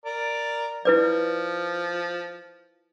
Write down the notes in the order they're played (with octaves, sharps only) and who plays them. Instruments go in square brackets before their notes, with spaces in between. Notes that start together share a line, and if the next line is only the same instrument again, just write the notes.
[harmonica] A#4 D5
[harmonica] F3 [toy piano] E4 B4 D5